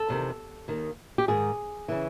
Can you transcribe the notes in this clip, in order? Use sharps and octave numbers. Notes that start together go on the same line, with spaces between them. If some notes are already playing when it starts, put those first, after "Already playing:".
Already playing: A4
E2 C3 D#3
D#2 D#3
G4
G#2 D#3 G#4
C#3 E3